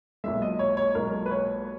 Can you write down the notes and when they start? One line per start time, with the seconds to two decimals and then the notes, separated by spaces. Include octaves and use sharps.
0.24 B1 A#2 G#3 E5
0.42 D#5
0.59 C#5
0.77 C#5
0.95 B1 A#2 G#3 A#4
1.26 B4
1.31 C#5